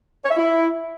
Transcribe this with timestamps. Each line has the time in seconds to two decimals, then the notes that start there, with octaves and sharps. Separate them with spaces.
0.25 C#5
0.31 E5
0.37 E4